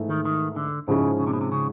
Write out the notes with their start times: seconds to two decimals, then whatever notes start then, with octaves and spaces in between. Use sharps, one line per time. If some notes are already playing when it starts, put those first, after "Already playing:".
Already playing: G#2 E3 A3
0.09 D#3
0.25 D#3
0.56 D3
0.88 G#2 C#3 F3 G#3 C#4 E4
1.19 C#3
1.27 C3
1.33 B2
1.41 C3
1.52 C#3